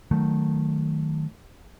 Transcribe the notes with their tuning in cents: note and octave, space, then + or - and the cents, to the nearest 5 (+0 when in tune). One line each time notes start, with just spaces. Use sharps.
D#3 +0 F#3 +0 A3 +0